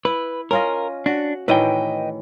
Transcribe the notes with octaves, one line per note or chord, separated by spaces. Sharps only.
E4 B4
C#4 F4 A#4 D#5
D4 F#4
A2 D#3 E3 B4 D#5 G5